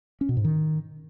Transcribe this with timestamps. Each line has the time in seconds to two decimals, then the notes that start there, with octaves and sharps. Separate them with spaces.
0.21 C#4
0.29 B2
0.37 G#2
0.45 D#3